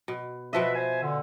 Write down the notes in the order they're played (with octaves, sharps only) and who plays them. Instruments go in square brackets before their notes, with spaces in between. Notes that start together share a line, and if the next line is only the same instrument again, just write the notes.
[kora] B2
[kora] B2 F3 D#5 [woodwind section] B4 E5
[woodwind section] C5 E5 G#5
A#2 D3